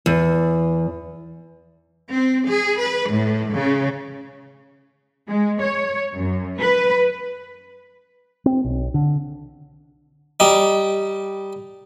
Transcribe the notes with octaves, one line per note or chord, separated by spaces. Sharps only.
E2
C4
G#4
B4
A2
C#3
G#3
C#5
F#2
B4
C4
B1
D3
G3 D#4